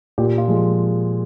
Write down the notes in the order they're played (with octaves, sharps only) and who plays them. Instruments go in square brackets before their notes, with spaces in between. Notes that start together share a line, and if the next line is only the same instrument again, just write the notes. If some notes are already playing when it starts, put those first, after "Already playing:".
[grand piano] A#2 G4
F4
F3 G#3